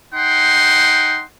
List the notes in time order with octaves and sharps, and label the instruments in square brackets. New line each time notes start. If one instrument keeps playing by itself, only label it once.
[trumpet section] D#4 F#5 G5 C6